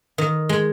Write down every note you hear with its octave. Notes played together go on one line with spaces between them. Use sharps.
D#3
G#3